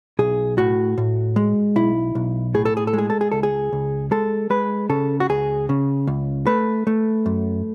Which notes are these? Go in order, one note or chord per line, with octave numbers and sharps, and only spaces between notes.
B1 G#4
A2 F#4
A2
G#3
B1 E4
B1
A2 G#4
A4
G#4
A4
G#3 G#4
A4
G#4
C#2 A4
G#4
C#2
G#3 A4
G#3 B4
C#3 A4
F#4
C#2 G#4
C#3
C#2
A3 B4
A3
F#2